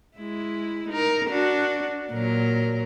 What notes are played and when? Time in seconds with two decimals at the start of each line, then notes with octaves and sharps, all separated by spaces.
0.18 G#3 E4
0.89 D#4 A#4
1.29 D4 F#4
2.12 A#2 F#3 A#4